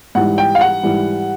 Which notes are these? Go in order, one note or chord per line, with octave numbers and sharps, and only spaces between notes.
G#2 E3 G3 F#5
G5
F5
F#5
G#2 E3 G3